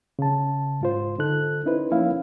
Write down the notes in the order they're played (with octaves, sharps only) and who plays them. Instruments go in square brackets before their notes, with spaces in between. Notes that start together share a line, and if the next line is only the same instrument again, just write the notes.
[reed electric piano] C#3 A5
G#2 F4 C5
D3 D#4 A4 F#6
C#4 D#4 E4 B4 C5
F3 A#3 C#4 E4 F5